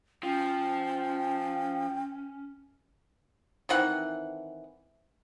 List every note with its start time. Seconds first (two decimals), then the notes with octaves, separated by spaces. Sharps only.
0.23 F3 C#4 G5
3.69 D#3 E3 C4 F#5